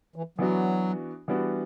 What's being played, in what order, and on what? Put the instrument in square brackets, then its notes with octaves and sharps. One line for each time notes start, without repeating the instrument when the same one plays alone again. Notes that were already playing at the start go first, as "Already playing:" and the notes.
[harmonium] E3
[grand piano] E3 B3 D4 F#4 [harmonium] F#3
[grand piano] E3 G3 B3 D4 F#4